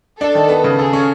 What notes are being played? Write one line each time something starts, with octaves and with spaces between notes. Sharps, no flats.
D4 A4
D#3
B3
C#3
G#4 A4
C#4